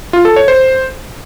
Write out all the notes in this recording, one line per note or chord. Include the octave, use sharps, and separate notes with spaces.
F4
A4
C#5
C5